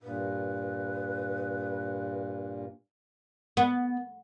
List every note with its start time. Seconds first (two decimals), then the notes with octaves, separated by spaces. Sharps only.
0.03 G2 A#2 B4
3.57 B3